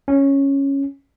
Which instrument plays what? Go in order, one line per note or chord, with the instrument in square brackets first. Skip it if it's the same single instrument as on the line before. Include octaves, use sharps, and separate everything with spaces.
[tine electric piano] C#4